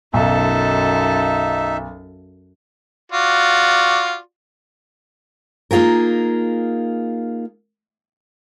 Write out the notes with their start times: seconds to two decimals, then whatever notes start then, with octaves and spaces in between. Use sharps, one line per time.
0.13 B1 F#2 D#4 A4 E5
3.12 F4 F#4 D5
5.71 A#3 D#4 F4 G#4 A#4